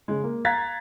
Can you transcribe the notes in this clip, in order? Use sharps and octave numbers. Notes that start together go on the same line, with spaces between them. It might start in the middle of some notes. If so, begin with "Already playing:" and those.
C#3 G#3
A#3
F5 A#5 F#6 G#6 A6 B6